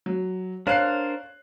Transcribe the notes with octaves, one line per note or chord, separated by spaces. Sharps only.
F#3
D4 A#4 C5 C#5 F5 F#6 C7